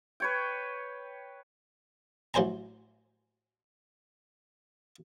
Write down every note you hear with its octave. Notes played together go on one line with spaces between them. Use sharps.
B4 C#5 G5
A1 F#3 C5 G#5 A#5